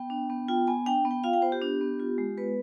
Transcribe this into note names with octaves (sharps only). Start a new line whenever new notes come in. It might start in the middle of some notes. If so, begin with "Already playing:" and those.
Already playing: B3 G5
D4
B3
F4 G5
B3 G#5
D4 G5
B3
G5
F4 F5
G5
B3 C5
G4
D4
B3
F4
G#3
B3 B4